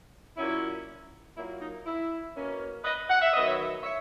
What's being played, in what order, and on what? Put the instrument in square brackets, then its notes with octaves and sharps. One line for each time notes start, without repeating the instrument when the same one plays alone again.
[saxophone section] A#2 F#3 C#4 E4
A#2 F#3 A#3 E4
D#4
E4
B2 A#3 C#4
B4 D#5
F#5
E5
D#3 F#3 B3 D#5
C#5 E5
C#5 E5